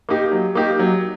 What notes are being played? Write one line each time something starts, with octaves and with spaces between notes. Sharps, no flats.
A#3 D#4 G4
F#3
A#3 D#4 G4
F#3